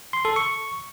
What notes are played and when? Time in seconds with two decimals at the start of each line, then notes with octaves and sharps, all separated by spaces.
0.13 C6
0.25 A4
0.36 C#6